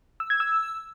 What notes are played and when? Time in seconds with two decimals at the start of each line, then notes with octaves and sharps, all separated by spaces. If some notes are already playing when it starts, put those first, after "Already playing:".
0.20 E6
0.30 G#6
0.40 E6